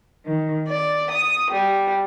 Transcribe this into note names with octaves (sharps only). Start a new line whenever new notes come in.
D#3
D5
D#6
G3